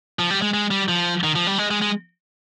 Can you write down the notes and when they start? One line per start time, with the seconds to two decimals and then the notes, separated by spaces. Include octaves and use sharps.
0.19 F3
0.30 G3
0.42 G#3
0.54 G#3
0.71 G3
0.89 F3
1.24 D#3
1.35 F3
1.47 G3
1.58 G#3
1.71 G#3
1.82 G#3